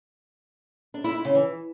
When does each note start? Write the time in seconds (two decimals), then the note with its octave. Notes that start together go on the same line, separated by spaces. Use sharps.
0.94 D4
1.04 E4
1.14 E4
1.25 C#3
1.35 E3